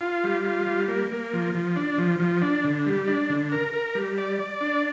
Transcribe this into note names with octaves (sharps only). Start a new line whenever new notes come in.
F4
G3
F4
G3
A#3
A#3
F3
F3
D4
F3
F3
D4
D3
G3
D4
D3
A#4
A#4
G3
D5
D5
D4